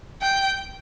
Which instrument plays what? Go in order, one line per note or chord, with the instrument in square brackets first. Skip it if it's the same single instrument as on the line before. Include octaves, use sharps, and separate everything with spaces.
[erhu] G5